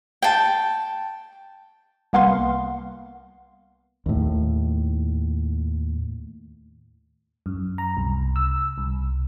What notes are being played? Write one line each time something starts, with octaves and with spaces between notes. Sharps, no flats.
G5 A5
C2 A#3 B3 F5 F#5 C6
D#2 A2
F#2
A#5
C2
E6
C2